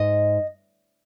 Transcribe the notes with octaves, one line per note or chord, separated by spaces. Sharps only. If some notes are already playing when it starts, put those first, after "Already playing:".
Already playing: G#2 D#5